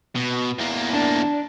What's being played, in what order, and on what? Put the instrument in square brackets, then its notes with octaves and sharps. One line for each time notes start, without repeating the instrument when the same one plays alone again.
[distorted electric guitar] B2
E2 A#3
[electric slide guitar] D4 D5